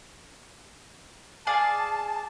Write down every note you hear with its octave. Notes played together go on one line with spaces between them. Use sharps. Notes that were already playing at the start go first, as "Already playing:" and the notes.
G#4 D5 F5 A5